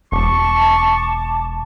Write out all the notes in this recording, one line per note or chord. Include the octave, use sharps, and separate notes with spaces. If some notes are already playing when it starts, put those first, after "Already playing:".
E1 A5 C#6 D6